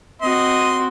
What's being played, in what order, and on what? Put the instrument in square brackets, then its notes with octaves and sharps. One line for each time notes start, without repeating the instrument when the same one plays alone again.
[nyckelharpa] C4 F#4 [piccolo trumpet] D#5 [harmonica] C6